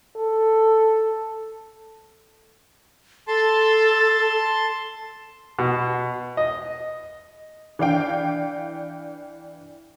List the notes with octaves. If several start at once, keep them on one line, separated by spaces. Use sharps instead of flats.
A4
A4 A5 C6
B2
D#5
E3 D4 F5 G5